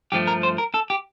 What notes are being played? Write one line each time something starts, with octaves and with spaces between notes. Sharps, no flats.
G2 F3 A3 G4
A#4
C5
A#4
A4
G4